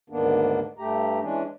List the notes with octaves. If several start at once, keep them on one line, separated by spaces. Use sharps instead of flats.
D2 G#2 D#3 A#3 B3 D4
G2 A3 G4 A#5
E3 G#3 C#4 D4